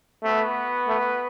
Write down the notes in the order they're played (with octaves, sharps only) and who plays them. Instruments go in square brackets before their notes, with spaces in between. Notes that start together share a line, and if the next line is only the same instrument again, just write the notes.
[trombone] A3 [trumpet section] B3 F#4 B4
[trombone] A3